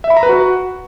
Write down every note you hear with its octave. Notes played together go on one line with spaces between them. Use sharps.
E5
B5
A#5
B4
F#4